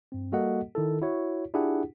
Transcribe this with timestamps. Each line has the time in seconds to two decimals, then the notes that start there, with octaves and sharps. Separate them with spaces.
0.12 G2 C4
0.32 G3 A#3 F#4 A4 D#5 F#5
0.75 D#3 E4 A4
1.02 E4 F#4 C#5
1.54 D4 E4 F4 G4 G#4 F#5